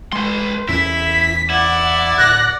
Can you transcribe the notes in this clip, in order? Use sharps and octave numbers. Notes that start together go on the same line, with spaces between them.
G#3 B4 C6
E2 C#4 E4 B6
E4 D5 F#5
D1 F#6 A#6